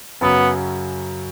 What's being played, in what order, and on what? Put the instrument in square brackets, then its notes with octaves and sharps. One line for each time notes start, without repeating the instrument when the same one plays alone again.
[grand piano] F#2 C#3 F#3 [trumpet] B3